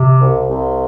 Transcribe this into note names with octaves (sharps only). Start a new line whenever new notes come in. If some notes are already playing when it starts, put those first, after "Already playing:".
Already playing: C3
C2
C2